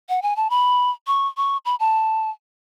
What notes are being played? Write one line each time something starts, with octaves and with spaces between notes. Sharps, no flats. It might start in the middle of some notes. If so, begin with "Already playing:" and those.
F#5
G#5
A5
B5
C#6
C#6
B5
A5